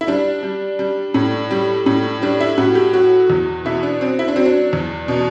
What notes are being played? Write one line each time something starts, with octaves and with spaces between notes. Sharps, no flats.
E4
G3 D4
G3
G3
A2
G3
A2
G3 D4
E4
A2 F#4
G4
F#3 F#4
E2
B2 E4
D4
F#3 C4
E4
D4
F#3 C4
D4
E2
B2